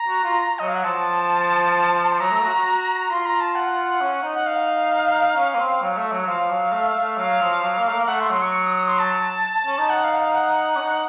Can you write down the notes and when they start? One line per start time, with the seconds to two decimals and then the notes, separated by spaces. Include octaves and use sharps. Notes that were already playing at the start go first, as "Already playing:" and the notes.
Already playing: A#5
0.08 F#4
0.24 F4
0.59 F#3 D#5
0.67 F5
0.75 F#5
0.84 F3 A5
2.12 C6
2.20 F#3 A#5
2.31 A3
2.43 F#4
2.54 F#4
3.10 F4 C6
3.26 A#5
3.40 A5
3.55 F#5
4.00 C#4
4.23 D#4
4.35 F#5
4.46 F5
5.36 C#4
5.54 A#3
5.59 C4
5.82 F#3
5.97 A3
6.12 F#3
6.27 F3 F5
6.50 F#3
6.72 A3
6.94 A3
7.17 F#3 F5
7.40 F3
7.62 F#3
7.78 A#3
7.88 A3
7.93 A#3
8.08 A3 F#5
8.20 C6
8.31 F#3 C6
8.42 C#6
8.53 C#6
8.65 D#6
8.76 D#6
8.88 C6
8.99 A5
9.66 C#4
9.78 D#4
9.89 F#5
10.04 F5
10.20 F5
10.34 F#5
10.76 C#4
10.80 D#4